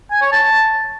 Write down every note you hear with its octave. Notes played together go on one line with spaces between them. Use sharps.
G#5
C#5
A5